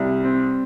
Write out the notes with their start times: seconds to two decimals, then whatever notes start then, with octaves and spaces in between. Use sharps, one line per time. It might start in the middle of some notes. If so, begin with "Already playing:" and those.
Already playing: C2 G3
0.24 C4